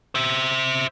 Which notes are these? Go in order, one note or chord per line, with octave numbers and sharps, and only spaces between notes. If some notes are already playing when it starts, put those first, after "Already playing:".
C5 E5